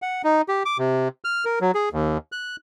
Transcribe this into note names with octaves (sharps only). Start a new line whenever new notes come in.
F#5
D#4
G4
D6
C3
F6
A#4
F#3
G#4
D#2
F#6